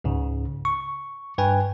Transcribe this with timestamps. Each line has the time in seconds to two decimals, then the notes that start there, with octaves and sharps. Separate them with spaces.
0.04 C#2 G#2 C#3
0.65 C#6
1.38 G2 B4 G5 G#5